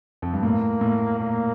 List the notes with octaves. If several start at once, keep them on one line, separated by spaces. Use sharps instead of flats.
F2
G2
A2 A#3
A2
A#2 A#3